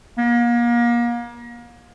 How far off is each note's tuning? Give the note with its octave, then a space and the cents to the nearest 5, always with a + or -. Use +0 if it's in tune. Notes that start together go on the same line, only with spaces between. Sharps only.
A#3 +35